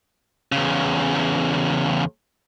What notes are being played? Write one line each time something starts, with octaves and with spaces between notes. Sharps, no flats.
E2 C#3